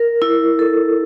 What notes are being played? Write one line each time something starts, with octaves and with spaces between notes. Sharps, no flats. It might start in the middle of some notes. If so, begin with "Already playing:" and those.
Already playing: A#4
E4
A4